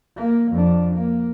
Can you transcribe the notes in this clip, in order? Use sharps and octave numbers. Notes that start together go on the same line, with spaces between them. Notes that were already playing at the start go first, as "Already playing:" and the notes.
A#3
F2 D4
A#3